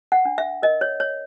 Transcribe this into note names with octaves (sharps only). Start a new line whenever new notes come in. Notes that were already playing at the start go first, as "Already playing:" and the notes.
F#5
D4
E5
A#4 D#5
C#5
C#5